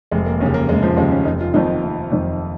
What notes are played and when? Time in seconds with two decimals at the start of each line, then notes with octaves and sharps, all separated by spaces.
0.11 F1 G#3
0.26 A#3
0.40 D#2 C#4
0.45 C#3
0.54 A#3
0.69 F1 G#3
0.83 F3
0.97 D#2 C#3 G#3
1.12 C#4
1.25 F1 D#4
1.41 F4
1.54 F2 D#3 D#4
1.69 F4
1.83 F1
2.12 F2 D#3